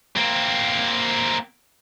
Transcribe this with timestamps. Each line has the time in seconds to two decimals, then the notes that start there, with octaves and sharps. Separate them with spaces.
0.16 A#3 C4